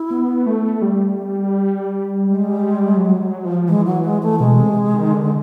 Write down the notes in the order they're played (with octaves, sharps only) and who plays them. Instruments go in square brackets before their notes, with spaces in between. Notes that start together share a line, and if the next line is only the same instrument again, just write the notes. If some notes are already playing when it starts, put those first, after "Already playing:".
Already playing: [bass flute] E4
[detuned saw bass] B3
A3
G3
[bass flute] G#3
[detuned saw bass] F#3
F#3
F3
[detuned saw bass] E3 [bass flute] G#3
[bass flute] F#3
G#3
A3
[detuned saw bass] B2 [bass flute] G#3
[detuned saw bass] C3
D#3
D3